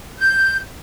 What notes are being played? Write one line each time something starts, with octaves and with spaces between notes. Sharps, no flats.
G6